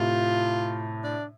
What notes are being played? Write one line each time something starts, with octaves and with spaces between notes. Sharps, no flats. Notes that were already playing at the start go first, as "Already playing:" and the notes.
Already playing: A2 C3 F4
D4